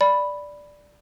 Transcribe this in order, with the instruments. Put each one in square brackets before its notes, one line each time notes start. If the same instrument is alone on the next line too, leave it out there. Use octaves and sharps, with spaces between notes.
[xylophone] D5 B5